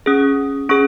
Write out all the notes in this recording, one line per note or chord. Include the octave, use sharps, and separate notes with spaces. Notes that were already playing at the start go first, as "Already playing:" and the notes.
C#4 G#4 D#6
C#4 G#4 C#6